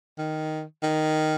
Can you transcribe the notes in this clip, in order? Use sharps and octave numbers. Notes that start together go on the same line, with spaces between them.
D#3
D#3